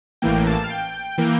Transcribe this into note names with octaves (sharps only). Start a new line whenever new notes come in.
A1 A2 E3 A#3 G5
A5
F5
G5
E3 A#3